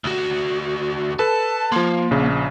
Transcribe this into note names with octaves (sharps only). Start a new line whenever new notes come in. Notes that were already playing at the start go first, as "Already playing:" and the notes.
D2 F#4
A4 B4 A5
F3 A#3 C6
A#1 C#3